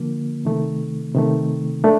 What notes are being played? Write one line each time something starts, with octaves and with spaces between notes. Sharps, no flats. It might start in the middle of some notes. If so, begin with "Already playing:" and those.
Already playing: D3 F3 A#3
C3 D#3 A3
C3 D#3 A3
A3 D4